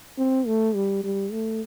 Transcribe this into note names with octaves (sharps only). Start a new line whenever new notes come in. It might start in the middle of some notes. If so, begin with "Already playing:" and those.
C4
A3
G3
G3
A3